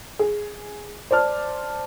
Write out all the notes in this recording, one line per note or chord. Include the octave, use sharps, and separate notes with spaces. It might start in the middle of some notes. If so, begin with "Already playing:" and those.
G#4
C5 D5 A5 F6